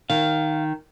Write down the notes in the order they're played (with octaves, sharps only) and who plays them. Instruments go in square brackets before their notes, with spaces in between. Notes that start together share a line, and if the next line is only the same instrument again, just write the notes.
[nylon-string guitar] D#3 [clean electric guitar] F5